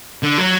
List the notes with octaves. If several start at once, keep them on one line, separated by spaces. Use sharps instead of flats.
D3
F#3